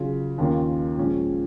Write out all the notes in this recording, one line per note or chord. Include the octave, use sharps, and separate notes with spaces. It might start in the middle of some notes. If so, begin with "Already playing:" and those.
Already playing: C#3 F#3 C#4 F4
D#2 D#3 A#3 C#4 F4
A#2 F3 G#3 C#4